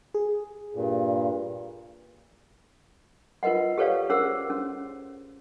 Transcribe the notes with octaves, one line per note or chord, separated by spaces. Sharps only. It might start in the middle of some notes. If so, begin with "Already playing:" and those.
G#4
G2 A#2
F4 A#4 B4 D#5 F#5
G4 A4 B4 C#5 D5 F5
C#4 G#4 A#4 C5 F#5 E6
C#4